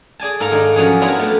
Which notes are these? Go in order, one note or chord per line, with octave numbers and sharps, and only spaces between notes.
G#4 D5 G#5 A5
G#2 A4 A#4 F5 A#5
D#3 G#3 D4
F3 F#3 C#4 G#4
B3 D4 E4 F4 G4 A#4
A3 A5